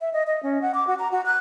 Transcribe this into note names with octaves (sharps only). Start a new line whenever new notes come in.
E5
D#5
D#5
C#4
F#5
D6
F#4
A#5
F#4
F#6